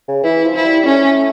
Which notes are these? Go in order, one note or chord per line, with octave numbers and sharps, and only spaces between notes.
C#3
E3 E4
F3
E4
G3
A3 C#4